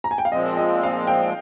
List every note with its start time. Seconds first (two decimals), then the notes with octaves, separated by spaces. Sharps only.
0.04 A#5
0.11 G#5
0.18 G5
0.25 F5
0.32 A#2 F3 G#3 C4 D#5
0.57 D#5
0.83 F5
1.07 G5